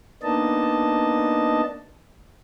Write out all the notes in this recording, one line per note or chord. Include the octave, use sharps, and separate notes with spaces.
A#3 B3 D4 D#4 D#5 A5